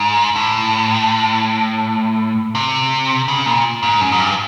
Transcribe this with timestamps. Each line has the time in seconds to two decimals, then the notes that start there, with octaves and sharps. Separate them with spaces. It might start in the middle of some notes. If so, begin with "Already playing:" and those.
Already playing: G#2
0.36 A2
2.55 C3
3.28 C#3
3.46 A#2
3.83 G#2
4.01 F#2
4.12 G#2
4.19 G2